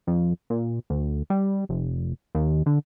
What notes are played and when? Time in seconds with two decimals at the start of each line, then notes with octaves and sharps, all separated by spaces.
0.07 F2
0.50 A#2
0.90 D2
1.30 G3
1.69 F1
2.35 D#2
2.66 D3